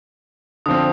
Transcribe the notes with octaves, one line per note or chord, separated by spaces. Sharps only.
D3 F3 C4 D#6